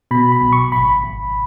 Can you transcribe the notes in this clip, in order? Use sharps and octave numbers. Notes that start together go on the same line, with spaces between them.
B2 B5
B5
B1
C#6
G#1 B5
G#1